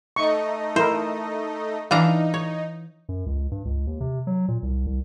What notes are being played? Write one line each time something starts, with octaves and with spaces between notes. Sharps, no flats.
A3 D#4 D#5 C#6
E4 A#4 C5
E3 D4 D#4 F5 A#5
C#5
F#2
C#2
G2
C#2
D#2
C3
F#3
A#2
C2
C2